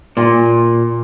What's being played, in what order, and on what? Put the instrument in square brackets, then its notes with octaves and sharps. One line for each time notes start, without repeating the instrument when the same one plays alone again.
[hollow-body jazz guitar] A#2